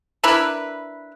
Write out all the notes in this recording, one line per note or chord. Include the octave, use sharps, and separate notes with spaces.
D4 E4 A#4 B4